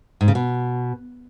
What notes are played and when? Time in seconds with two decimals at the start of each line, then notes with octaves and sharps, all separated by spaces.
0.21 G#2
0.28 C#3
0.35 B2